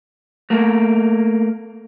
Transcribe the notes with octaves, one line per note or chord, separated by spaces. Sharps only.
A3 A#3